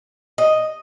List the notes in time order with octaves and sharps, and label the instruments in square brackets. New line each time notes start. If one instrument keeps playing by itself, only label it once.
[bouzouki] D#5